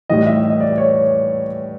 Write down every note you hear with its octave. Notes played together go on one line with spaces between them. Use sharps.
A2 E3 G3 D#5
E5
D#5
D5
C#5